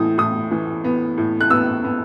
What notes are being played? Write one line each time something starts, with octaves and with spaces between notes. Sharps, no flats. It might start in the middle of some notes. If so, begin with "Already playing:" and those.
Already playing: A2 E3 D#6
A2 D#6
E3
B3
A2
F#6
B3 E6
B3